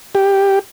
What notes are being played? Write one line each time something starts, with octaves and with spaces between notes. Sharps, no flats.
G4